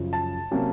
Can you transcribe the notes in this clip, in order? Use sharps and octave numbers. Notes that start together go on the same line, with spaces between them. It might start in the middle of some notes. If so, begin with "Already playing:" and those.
Already playing: F#2 C#3 F3
A5
C3 F#3 A#3 C#4